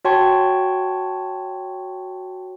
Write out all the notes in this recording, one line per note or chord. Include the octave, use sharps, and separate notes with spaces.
F#4 C#5 G5 A5 C6 C#6